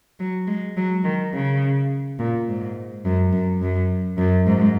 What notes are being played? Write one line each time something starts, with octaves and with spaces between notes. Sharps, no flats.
F#3
G#3
F#3
D#3
C#3
A#2
G#2
F#2
F#2
F#2
F#2
G#2